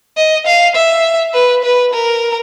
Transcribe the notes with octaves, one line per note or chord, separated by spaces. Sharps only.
D#5
F5
E5
B4
B4
A#4